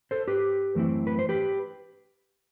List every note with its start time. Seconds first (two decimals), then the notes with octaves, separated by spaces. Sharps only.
0.11 A4 C5
0.28 G4 B4
0.75 F#2 E3 A3 C4 E4
1.07 B4
1.19 C5
1.29 G4 B4